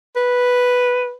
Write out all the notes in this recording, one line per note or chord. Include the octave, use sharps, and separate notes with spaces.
B4